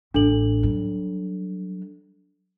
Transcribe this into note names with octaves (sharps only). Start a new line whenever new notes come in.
A1 D4 A4 F#7
F#3 G3